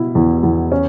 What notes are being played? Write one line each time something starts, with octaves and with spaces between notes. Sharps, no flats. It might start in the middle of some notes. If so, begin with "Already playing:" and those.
Already playing: B2 E4
E2
E2
C#4